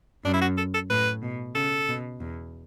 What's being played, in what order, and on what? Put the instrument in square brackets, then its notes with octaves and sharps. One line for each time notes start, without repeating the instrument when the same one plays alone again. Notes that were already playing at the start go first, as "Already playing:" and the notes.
[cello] F#2 [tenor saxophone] D4
[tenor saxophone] E4
F#4
A4
A4
[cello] A2 [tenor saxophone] B4
[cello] B2
[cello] C#3 [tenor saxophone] A4
[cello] B2
E2